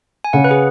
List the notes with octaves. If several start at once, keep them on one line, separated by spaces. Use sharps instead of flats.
G#5
C#3 F#5
B4
G#4